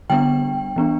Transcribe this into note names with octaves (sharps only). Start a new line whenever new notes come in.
D3 G3 B3 D4 G5
E3 B3 D4